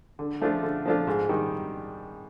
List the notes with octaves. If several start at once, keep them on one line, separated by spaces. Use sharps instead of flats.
D3
F3 A3 D4 F4
D3
F3 A3 D4 F4
G#2
D#3 G3